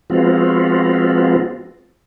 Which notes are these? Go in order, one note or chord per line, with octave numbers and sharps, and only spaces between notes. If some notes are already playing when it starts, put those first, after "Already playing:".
F3 G#3 B3 C4 F4 F#4